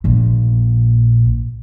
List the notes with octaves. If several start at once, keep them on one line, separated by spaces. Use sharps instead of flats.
A#1 A#2